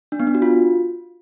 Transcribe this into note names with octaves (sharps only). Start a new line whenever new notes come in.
D4
B3
D4
F#4
F4